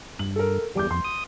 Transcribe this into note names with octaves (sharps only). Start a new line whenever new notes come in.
G2 F#7
A4 A#4
E2 G3 D6 G6
F2 C6
D#6